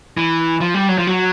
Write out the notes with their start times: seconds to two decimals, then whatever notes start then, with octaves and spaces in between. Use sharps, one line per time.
0.17 E3
0.61 F3
0.74 G3
0.89 F#3
0.98 F3
1.07 F#3